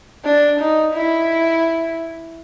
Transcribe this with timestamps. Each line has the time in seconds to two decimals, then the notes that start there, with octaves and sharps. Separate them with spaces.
0.25 D4
0.60 D#4
0.94 E4